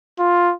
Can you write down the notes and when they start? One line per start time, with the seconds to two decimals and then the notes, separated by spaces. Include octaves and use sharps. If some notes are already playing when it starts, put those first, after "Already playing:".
0.19 F4